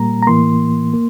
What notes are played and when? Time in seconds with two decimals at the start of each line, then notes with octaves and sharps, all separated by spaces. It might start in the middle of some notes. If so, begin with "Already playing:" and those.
Already playing: A#2 G3 A#3 A#5
0.23 A#5
0.27 A2 E3 A#3 C6
0.94 A#3